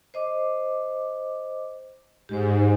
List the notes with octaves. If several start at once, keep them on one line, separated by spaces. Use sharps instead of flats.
C5 D#5 D6
G#2 G4 C5